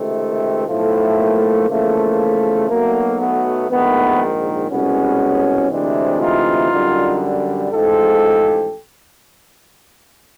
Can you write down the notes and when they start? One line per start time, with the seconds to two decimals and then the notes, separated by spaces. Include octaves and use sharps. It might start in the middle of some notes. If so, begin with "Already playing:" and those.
Already playing: C#2 C3 D#3 A3
0.68 B1 A2 F3 A3
1.18 A#3
1.68 E2 C#3 F3 A3
2.69 B1 B2 F#3 A3 A#3
3.19 A3 B3
3.69 A#1 G#2 D#3 A3 B3
4.69 C2 B2 G#3 B3 C#4
5.70 D2 C3 E3 G#3 C4 D4
6.20 D#4 F4
6.70 F#2 D3 G3
7.71 A1 G#2 F3 G#3 G4 A4